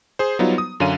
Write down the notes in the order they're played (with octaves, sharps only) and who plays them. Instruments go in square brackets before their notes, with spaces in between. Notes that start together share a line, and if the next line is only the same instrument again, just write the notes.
[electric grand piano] G#4 C5
F#3 G3 B3 D#4 F4
D#6
F#2 D3 C#4 F5 D#7